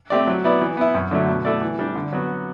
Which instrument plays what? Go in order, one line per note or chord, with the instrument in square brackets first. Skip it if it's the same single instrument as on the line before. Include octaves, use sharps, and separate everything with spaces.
[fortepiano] A3 C4 G4 D5
F#3
B3 E4 B4 D5
E3
B3 E4
F#2
D3 F#3 A3
B2
A3 E4 A4 D5
E3
G3 D4
D3
F#3 B3 F#4